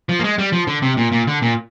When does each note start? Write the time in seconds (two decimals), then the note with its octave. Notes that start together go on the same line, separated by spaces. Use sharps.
0.09 F3
0.19 A#3
0.24 G#3
0.38 G3
0.52 F3
0.67 D3
0.82 C3
0.97 A#2
1.12 A#2
1.27 D3
1.42 A#2